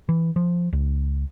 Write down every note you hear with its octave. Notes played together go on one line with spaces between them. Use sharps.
E3
F3
C#2